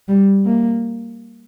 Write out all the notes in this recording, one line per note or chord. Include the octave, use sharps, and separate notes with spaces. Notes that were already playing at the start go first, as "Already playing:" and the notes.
G3
A#3